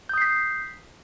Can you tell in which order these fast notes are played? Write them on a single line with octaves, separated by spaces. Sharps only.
G6 D#6 C7 B6